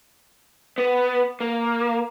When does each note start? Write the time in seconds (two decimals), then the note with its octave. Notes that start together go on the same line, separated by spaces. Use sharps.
0.78 B3
1.40 A#3